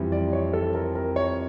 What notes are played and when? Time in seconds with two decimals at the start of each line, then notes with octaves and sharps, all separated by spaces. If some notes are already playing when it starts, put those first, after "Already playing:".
Already playing: F2 E3 G3
0.12 D5
0.33 C#5
0.53 A4
0.75 A#4
0.95 A#4
1.16 C#5